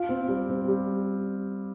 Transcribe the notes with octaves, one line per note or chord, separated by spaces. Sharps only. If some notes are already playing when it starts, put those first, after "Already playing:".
Already playing: F4
C4
G3
C4
G3